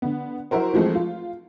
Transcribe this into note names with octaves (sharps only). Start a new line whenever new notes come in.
D3 B3
F#3 E4 F#4 A#4 C5
E3 F3 G#3 A3 C4
F4